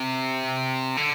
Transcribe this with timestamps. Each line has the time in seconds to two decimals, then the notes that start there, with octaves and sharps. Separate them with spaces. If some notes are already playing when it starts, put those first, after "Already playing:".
Already playing: C3
0.97 D3